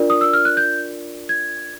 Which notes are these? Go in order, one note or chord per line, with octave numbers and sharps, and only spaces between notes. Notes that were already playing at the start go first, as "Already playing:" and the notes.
Already playing: D4 F4 A#4 D5
D#6
E6
F6
F#6
G6
G#6